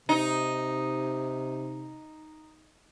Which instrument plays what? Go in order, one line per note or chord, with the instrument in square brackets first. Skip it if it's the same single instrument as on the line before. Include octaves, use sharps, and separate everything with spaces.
[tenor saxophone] C3 [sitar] D#4